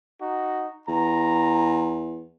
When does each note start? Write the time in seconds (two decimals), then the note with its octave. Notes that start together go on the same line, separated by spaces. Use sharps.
0.21 D#4 F#4
0.88 E2 A#5